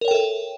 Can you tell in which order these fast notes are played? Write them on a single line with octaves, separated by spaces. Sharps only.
A#4 C#5 G5 A4 E5